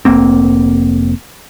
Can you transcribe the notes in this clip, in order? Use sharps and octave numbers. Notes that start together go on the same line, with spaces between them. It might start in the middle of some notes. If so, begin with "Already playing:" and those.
F1 A#3 C4